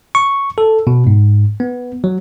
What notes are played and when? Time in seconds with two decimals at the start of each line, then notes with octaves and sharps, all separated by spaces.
0.15 C#6
0.58 A4
0.87 B2
1.07 G#2
1.60 B3
2.04 F#3